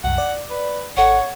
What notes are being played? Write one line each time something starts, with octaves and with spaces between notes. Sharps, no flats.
C2 F#2 F#5
D5
B4
G#1 A4 C#5 F#5